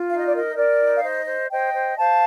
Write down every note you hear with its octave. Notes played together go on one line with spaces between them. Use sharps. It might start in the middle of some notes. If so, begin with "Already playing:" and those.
Already playing: F4
D#4 F5
D#5
D5
A#4 D#5
A#4 D5
D#4
F5
C5 D#5
C5
C5 D#5 G5
C5
C5 F5 A5